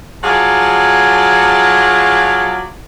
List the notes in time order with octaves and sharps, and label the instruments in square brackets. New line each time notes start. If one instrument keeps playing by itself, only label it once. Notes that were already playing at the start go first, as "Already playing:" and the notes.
[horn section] F#3 F4 G#4 D5 A5